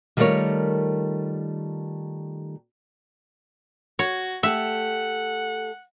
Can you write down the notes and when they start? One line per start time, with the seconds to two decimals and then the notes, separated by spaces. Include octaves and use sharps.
0.17 D#3 G3 A3 F4 A#4 C#5
3.99 F#4 C#5
4.43 A3 G4 A4 E5 F#5